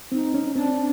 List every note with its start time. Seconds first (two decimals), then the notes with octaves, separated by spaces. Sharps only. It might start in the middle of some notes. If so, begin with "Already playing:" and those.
0.12 C4 D#4
0.34 C#4
0.55 C4 D4